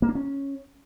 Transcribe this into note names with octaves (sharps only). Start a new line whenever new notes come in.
A#3
D4
C#4